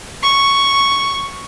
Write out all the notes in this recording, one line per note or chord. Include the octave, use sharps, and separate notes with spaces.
C#6